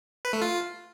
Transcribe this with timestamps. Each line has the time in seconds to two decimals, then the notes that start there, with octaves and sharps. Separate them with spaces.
0.25 B4
0.33 A3
0.41 F4